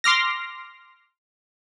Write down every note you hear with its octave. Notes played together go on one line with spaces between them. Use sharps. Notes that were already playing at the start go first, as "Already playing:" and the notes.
C6 D6 F6 A#6